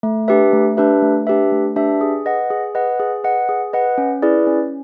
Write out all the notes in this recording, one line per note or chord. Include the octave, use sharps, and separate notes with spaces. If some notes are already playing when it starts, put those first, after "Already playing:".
A3
D4 G4 B4 E5
A3
D4 G4 B4 E5
A3
D4 G4 B4 E5
A3
D4 G4 B4 E5
G#4
B4 D#5 F#5
G#4
B4 D#5 F#5
G#4
B4 D#5 F#5
G#4
B4 D#5 F#5
C#4
E4 G#4 B4 D5
C#4